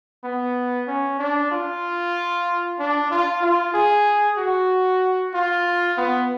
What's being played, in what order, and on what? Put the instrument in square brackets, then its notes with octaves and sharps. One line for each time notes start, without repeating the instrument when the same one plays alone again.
[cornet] B3
C#4
D4
F4
D4
F4
F4
G#4
F#4
F4
B3